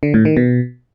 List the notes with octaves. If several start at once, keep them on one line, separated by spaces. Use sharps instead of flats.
D3
A2
D#3
B2